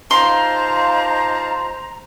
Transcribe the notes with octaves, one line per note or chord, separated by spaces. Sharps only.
D#4 F4 G4 C5 F5 A5 A#5 C6